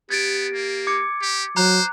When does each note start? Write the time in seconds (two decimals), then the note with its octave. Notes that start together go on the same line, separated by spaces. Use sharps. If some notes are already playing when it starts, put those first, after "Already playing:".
0.10 B3 G4 G#6 A6 D7
0.54 A#3
0.87 D6 G#6 C#7
1.21 G4
1.57 F#3 C5 A#5 F#6